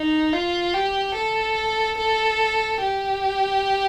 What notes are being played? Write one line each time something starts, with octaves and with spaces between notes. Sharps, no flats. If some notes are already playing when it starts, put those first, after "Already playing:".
Already playing: D#4
F4
G4
A4
A4
G4